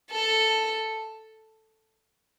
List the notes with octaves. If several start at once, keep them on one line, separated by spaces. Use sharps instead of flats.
A4